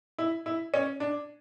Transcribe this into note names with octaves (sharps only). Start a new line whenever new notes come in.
E4
E4
C#4
D4